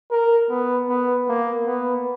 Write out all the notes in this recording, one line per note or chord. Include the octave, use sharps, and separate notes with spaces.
A#4
B3
B3
A#3
B3